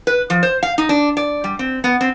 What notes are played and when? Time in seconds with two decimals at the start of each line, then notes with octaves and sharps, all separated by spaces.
0.07 B4
0.30 F3
0.43 C5
0.63 F5
0.78 D#4
0.89 D4
1.17 D5
1.44 G3
1.59 C4
1.84 B3
2.01 C4